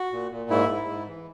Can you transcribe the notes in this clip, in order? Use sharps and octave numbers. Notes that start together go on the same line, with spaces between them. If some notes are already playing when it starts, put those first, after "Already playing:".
Already playing: F#4
A#2
A#2
G#2 E4
G#2
G#2
E3